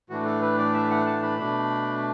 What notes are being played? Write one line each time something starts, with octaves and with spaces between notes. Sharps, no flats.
A2 E3 A3 D4 F#4
A4
B4
D5
E5
F#5
A5
B5
B2 A3 D4